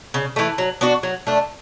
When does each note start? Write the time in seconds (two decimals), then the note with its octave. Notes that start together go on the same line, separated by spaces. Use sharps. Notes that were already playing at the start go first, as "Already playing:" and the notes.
0.14 C#3
0.36 E3 A3
0.58 F#3
0.81 B3 D4 F#4
1.03 F#3
1.27 A3 D4